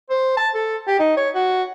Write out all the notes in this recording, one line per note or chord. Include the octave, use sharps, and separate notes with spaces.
C5
A5
A4
G4
D#4
C#5
F#4